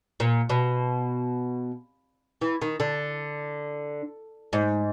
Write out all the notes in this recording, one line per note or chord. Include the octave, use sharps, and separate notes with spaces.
A#2
B2
E3
D#3
D3
G#2